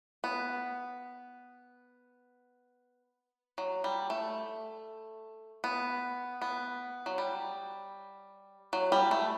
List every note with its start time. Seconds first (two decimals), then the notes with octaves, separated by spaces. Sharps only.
0.24 B3
3.58 F#3
3.84 G3
4.10 A3
5.64 B3
6.42 B3
7.06 F#3
7.18 G3
8.73 F#3
8.92 G3
9.11 A3